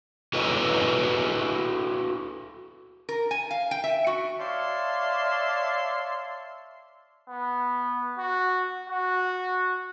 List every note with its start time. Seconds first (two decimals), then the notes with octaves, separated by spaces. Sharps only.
0.33 E4 F#4 A4 B4 C#5 D#5
3.09 A#4
3.31 G#5
3.51 F5
3.71 G5
3.84 E5
4.07 F#4
4.40 C#5 D5 E5 F5 A5 C6
7.28 B3
8.18 F#4
8.89 F#4